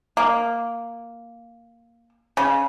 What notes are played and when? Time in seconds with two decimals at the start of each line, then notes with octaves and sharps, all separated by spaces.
0.17 A#3
2.37 C#3